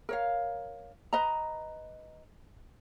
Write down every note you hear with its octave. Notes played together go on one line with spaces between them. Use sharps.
A#4 C#5 F5
B4 D#5 A#5